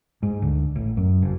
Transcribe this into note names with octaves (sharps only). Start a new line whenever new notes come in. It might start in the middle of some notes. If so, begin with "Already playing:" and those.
G#2
D2
A1
F#2
F#1